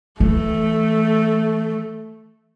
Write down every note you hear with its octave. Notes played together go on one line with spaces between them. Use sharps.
E3 A3